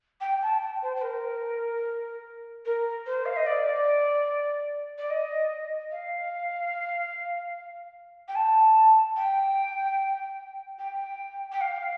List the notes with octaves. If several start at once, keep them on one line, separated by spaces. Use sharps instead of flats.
G5
A5
G5
C5
C5
A#4
A#4
C5
F5
D#5
D5
D5
D#5
F5
G5
A5
G5
G5
G5
F5